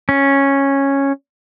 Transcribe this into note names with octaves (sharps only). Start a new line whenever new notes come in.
C#4